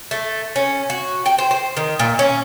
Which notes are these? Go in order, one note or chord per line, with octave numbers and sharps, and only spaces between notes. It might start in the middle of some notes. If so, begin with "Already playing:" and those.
A3
C#4
F#4
G5
C5
C5
D#3
A#2
C#4